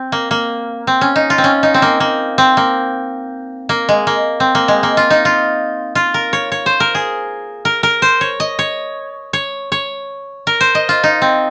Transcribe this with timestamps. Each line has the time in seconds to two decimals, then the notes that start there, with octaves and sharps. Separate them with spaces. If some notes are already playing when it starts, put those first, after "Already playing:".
Already playing: C4
0.12 A#3
0.31 A#3
0.87 C4
1.01 C#4
1.16 D#4
1.30 F4
1.38 C4
1.44 C#4
1.63 D#4
1.74 C4
1.82 A#3
2.00 A#3
2.38 C4
2.57 A#3
3.69 A#3
3.89 G#3
4.07 A#3
4.40 C4
4.55 A#3
4.68 G#3
4.83 A#3
4.97 F4
5.10 D#4
5.25 F4
5.95 F4
6.14 A#4
6.33 C#5
6.52 C#5
6.66 C5
6.80 A#4
6.95 G#4
7.65 A#4
7.83 A#4
8.02 C5
8.21 C#5
8.40 D#5
8.59 C#5
9.33 C#5
9.72 C#5
10.47 A#4
10.60 C5
10.75 D#5
10.89 F4
11.04 D#4
11.22 C4